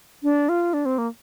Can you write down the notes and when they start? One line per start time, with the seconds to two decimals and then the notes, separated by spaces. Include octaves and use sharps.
0.23 D4
0.49 F4
0.74 D4
0.85 C4
0.98 A#3